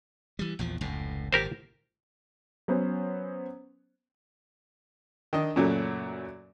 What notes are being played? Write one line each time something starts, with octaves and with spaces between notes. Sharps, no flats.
E3 G3
A#1 E2 F3
F1 C#2 A2
G#1 A#2 G4 A#4 C5
F#3 B3 C#4 C5
D#3 D4 D#5
F#2 A#2 C#3 F#3 A3